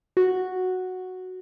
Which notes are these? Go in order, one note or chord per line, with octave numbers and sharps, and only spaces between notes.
F#4